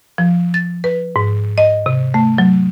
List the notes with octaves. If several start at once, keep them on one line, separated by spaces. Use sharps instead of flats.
F3
A6
B4
G#2
D#5
C3
A3
F#3